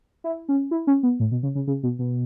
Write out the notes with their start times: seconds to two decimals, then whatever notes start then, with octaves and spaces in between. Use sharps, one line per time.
0.24 E4
0.49 C#4
0.71 E4
0.87 C#4
1.03 B3
1.20 A2
1.31 B2
1.43 C#3
1.55 C#3
1.67 C#3
1.83 B2
1.99 B2